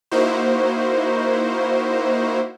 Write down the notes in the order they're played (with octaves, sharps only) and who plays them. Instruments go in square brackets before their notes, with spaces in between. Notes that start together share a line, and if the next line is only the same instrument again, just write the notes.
[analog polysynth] A#3 D#4 E4 F#4 C5